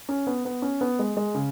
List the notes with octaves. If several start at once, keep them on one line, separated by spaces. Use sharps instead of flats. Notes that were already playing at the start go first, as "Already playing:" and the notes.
C#4
B3
B3
C#4
B3
G#3
G#3
C#3